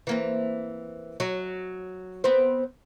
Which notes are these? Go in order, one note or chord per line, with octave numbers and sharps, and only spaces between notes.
E3 A#3 C4
F#3
B3 C4 C5